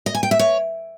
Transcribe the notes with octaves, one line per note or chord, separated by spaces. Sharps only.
D#5
G#5
G5
E5
C#5